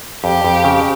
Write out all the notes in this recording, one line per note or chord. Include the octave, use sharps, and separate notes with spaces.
F2 G4
F2
C#3